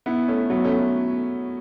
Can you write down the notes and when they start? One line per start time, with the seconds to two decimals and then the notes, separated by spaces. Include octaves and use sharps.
0.06 B3 E4
0.28 A3 C#4
0.50 F#3 B3
0.64 A3 C#4